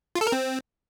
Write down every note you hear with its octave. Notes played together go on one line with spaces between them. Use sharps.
F4
A4
A#4
C4